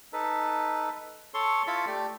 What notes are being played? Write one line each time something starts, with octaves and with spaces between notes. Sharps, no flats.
D#4 A4 B4
A4 C#5 C6 C#6
E4 F4 A5 B5 C#6
A3 G4 D5